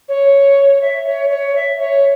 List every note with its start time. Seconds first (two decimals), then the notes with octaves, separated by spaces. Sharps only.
0.08 C#5
0.81 E5
1.06 C#5
1.29 C#5
1.55 E5
1.79 C#5